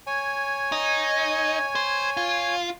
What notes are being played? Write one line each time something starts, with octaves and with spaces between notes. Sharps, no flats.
C#5 G#5
D#4
C5
F4